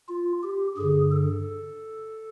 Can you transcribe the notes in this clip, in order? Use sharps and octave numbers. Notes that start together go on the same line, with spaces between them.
F4
G4
G2 D3 G#4
A4